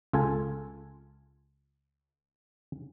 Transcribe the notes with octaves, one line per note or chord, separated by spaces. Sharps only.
C#2 F4 A4 G#5